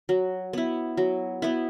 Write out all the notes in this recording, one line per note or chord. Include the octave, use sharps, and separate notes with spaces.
F#3
B3 E4
F#3
B3 E4